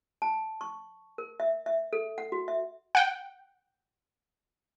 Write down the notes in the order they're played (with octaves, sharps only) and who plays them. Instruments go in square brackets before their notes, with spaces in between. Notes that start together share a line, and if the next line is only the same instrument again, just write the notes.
[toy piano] A5
C#6
A#4
E5
E5
A4
F#5
F#4
E5
[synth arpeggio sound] F#5 G5